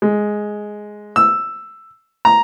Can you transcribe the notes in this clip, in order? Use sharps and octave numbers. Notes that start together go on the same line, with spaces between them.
G#3
E6
A#5